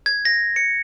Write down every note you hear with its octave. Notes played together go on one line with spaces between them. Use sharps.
G#6
A#6
C#7